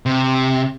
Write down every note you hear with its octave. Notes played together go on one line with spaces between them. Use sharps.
C3